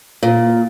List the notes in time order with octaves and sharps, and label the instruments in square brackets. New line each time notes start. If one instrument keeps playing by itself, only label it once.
[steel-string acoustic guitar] A#2